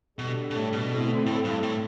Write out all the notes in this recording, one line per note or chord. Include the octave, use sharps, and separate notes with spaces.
B2 D3 G3 D4 A4
B2
A2
B2
D3 A3 C4 E4
A2
G2
A2